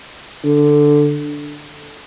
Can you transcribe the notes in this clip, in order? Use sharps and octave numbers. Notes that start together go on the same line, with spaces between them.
D3